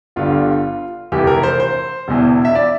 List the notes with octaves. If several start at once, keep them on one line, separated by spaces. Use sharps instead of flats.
G1 G2 D3 F4
F1 F2 E3 G4
A#4
C5
C5
E1 E2 E3
E5
D5